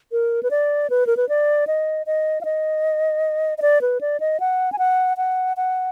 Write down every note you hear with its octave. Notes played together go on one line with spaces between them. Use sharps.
A#4
B4
D5
B4
A#4
B4
D5
D#5
D#5
F5
D#5
D#5
D5
B4
D5
D#5
F#5
G#5
F#5
F#5
F#5